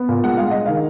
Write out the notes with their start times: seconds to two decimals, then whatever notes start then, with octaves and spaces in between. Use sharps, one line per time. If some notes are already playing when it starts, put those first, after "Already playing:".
Already playing: B3
0.09 A#2
0.24 G#3 F#5
0.37 G#3 F5
0.51 G#3 D#5
0.66 D#3 F5